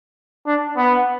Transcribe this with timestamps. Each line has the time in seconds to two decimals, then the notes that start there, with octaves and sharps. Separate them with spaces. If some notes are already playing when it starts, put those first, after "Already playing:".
0.46 D4
0.76 B3